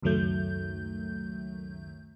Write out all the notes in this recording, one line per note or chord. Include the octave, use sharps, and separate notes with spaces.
C#2 F#2 D#3 F#3 A3 G6